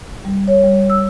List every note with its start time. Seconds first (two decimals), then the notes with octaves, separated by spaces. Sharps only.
0.25 G3
0.48 C#5
0.64 G3
0.90 E6